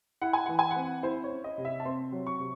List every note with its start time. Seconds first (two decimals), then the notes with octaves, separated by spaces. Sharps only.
0.22 E4 F#5
0.33 G#5
0.46 E3 F#5
0.59 G#5
0.71 F#5
0.76 C4
1.03 E4 C5
1.24 C#5
1.30 C#4
1.44 D#5
1.58 C3
1.65 E5
1.80 A5
1.85 C4 C6
2.12 F#3
2.27 C#6
2.40 C3